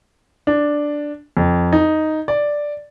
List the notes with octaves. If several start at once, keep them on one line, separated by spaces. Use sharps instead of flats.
D4
F2
D#4
D5